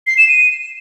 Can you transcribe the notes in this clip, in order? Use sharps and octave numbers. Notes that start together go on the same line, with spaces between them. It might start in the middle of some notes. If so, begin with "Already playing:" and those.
C7
E7
D#7